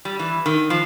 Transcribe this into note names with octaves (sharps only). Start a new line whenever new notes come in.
G3
E3
D#3
F3